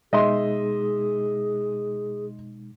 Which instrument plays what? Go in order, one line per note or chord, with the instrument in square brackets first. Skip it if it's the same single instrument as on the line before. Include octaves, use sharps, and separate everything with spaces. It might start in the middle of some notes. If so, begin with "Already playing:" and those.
[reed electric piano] B2 G#3 D#4 [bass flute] G#4 [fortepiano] D#5 E5 C6